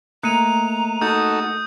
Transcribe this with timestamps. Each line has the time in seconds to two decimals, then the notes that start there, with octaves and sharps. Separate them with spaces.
0.23 A3 A#3 A#5 F#6 C#7 D#7
1.01 D#4 F#4 A4 D#6 G6